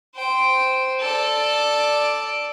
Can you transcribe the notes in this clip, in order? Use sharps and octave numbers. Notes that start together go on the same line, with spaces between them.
C5 G5
A4 D5